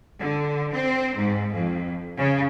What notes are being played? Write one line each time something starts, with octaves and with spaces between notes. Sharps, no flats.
D3
C4
G#2
F2
C#3